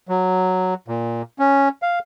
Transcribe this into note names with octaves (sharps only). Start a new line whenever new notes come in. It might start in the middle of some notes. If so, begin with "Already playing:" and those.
F#3
A#2
C#4
F5